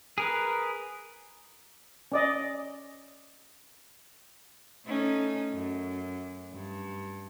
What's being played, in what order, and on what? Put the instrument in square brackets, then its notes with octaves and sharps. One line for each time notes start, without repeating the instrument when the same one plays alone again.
[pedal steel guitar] G#4 A#4 B4
[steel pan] C#4 D5 D#5
[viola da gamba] A3 C#4 D#4
F#2
G2